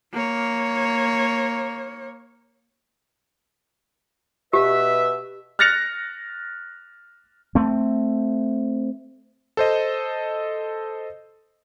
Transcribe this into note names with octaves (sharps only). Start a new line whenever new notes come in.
A#3 C#5
B2 G4 B4 E5
F6 F#6 A6 A#6 C#7 F7
A3 C4
A4 C5 D#5